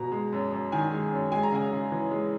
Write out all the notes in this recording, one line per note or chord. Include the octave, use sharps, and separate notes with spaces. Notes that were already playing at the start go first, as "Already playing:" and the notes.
Already playing: B2 A#5
G#3
F#2
F#2
D#3 G#5
G#3
F#2
G#3 G#5
A#5
C#3 G#5
C#3
E3
G#3